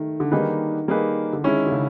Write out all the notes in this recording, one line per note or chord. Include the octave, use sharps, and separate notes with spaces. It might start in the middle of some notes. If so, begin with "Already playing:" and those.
Already playing: D#3 A3
D3
D#3 G3 A#3 D#4 G#4 B4
G3 A#3 D#4 G#4 B4
D3
D#3 G#3 C#4 E4
D3
C#3